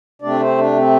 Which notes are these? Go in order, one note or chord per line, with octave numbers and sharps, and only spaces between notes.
C3 A3 C4 D4 D5
C4 C5
D4
C4